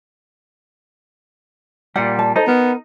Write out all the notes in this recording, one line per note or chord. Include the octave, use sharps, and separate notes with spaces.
A#2 G3 F#5
A5
D#4 A4 C5 D#5
B3 A#4